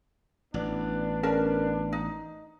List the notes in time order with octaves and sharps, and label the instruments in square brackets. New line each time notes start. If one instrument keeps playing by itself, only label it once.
[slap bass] A1 [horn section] B3 D4
[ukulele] C#4 A#4 A5
D#4